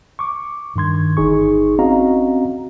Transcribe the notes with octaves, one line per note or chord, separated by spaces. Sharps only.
C#6 D6
G2 D#3 C6 G#6
G1 D#4 G#4 C#6
C4 C#4 F#4 D#5 F5 A#5